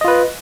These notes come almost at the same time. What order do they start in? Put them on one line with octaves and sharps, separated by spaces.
D#5 F4 B4